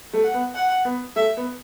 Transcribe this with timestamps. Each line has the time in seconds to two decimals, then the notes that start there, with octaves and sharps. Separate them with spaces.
0.13 A3
0.24 F#5
0.34 B3
0.55 F#5
0.85 B3
1.16 A3 E5
1.37 B3